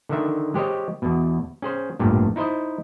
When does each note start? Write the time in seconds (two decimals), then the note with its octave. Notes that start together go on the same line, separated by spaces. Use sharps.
0.09 D3 D#3 E5
0.54 G#3 G4 C5 C#5 D#5
1.02 E2 B2
1.62 C#4 G#4 C5
1.99 A1 E2 G2 A#2
2.36 D#4 E4 C5 D#5